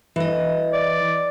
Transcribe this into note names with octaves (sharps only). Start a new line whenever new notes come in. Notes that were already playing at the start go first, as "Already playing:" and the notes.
E3 D#5
D5